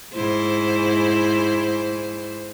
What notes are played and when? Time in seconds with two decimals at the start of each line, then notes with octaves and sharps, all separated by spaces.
0.14 G#2 E4 C5